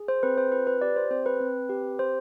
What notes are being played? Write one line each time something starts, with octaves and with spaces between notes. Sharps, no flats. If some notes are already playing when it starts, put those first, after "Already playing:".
Already playing: G#4
C5
C4 B4
C5
F4 B4
B4
G4 D5
C5
C4 C5
B4
C4
G4
C4 C5